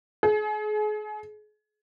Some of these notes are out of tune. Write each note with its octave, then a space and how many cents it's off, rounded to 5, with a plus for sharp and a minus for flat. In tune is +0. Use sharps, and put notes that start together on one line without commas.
G#4 +35